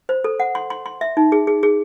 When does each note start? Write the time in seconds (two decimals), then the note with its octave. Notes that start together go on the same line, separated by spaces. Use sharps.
0.09 C5
0.24 A4
0.40 F#5
0.55 C6
0.70 C6
0.86 C6
1.01 E5
1.17 D#4
1.32 G#4
1.47 G#4
1.63 G#4